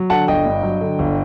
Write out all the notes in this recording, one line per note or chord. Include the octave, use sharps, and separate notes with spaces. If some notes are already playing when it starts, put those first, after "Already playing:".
Already playing: F#3
D3 F#5 A5
G1 D#5 G5
G2
F#3
D3
G1